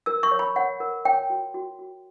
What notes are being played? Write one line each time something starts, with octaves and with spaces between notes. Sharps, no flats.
A#4 E6
C#6
C#5
B5
C#5 F#5
A#4
C#5 G5
F#4
F#4
F#4